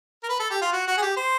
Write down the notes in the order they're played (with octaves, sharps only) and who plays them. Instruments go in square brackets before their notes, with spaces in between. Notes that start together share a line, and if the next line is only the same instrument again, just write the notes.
[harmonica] A#4
B4
A4
G4
F4
F#4
F#4
G#4
G4
C5